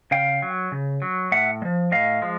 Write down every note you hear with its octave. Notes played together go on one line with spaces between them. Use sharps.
C#3 F5 G5
F#3
C#3
F#3
A2 E5 F#5
G#3
F3
A2 D#5 F5
F3 G#3